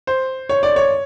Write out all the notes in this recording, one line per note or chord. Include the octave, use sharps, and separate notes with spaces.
C5
C#5
D5
C#5